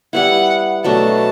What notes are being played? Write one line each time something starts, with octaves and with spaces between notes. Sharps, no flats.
G3 B3 E4 F#5
B2 F#3 A3 D4 A5